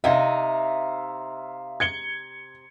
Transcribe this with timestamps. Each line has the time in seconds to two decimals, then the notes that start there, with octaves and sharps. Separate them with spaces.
0.04 C3 D#4 E5 F5
1.80 G#6 C#7 G7